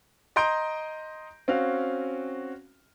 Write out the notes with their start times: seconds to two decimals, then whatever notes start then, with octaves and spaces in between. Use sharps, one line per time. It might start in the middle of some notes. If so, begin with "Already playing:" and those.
0.36 D#5 A#5 C6 G6 D7
1.48 C4 C#4 F#4 F5